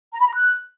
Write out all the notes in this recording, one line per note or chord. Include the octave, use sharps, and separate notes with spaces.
A#5
B5
A#5
F#6